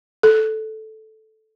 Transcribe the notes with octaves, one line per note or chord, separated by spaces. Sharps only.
A4